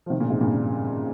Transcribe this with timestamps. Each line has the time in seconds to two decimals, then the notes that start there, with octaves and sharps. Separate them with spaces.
0.06 F3
0.10 C3 D#3
0.20 A#2 C#3
0.30 G#2 C3
0.41 G2 A#2
0.51 G2